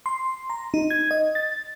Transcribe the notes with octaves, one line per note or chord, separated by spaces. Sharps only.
C6
A#5
D#4
G#6
D#5
A6